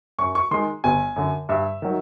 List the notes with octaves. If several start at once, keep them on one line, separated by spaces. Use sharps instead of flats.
F#2 C#6
C#6
D#3 G#3 C6
G1 G#5
F#2 D3
G2 E5
D#3 F#3